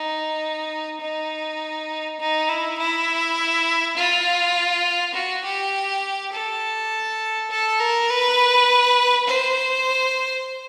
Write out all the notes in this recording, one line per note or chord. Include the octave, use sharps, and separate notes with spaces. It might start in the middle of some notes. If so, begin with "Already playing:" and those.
Already playing: D#4
D#4
D#4
E4
E4
F4
F#4
G4
A4
A4
A#4
B4
C5